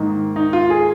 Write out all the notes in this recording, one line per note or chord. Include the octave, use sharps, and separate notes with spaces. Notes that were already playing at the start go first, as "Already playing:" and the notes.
Already playing: G#2 D#3 A#3 D#4
D#4
F4
G#4